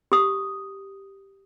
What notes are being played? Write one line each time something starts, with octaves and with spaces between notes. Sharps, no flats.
G4 D#6